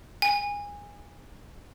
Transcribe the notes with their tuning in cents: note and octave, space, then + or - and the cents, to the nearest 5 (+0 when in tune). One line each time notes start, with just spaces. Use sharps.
G#5 -20